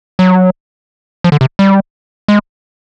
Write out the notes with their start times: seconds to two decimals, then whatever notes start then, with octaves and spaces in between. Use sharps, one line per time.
0.19 F#3
1.24 F3
1.32 D3
1.41 C3
1.59 G3
2.28 G#3